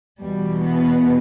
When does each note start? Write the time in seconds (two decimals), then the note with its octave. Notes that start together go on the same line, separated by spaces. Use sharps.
0.21 E2 B2 G3
0.63 B3